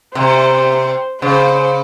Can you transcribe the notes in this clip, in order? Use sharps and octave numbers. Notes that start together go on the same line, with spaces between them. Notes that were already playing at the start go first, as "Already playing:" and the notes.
C3 C5
C#3 C5